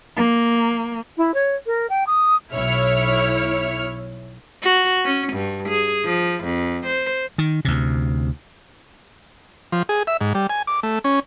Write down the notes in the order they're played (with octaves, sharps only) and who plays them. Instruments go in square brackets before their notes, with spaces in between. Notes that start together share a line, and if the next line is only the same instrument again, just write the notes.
[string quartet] A#3
[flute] E4
C#5
A#4
G5
D#6
[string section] B1 E4 C#5 F6 C#7
[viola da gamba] F#4
C#4
G2
G#4
F3
F2
C5
[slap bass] D#3
D2 C3
[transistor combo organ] F3
G#4
E5
G#2
G3
G#5
D6
A3
C#4